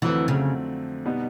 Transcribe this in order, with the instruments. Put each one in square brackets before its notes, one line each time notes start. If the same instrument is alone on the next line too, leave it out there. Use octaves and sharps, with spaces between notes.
[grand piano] F2 D3 F#3 A3 C4 [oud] E3
[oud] C#3
[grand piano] B2 G3 B3 D#4